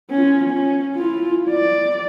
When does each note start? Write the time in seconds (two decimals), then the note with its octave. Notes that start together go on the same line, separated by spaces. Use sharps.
0.11 C#4 F4
0.50 C#4
0.95 E4 F4
1.50 D5